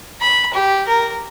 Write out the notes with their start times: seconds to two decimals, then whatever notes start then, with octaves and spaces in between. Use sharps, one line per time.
0.21 B5
0.54 G4
0.87 A#4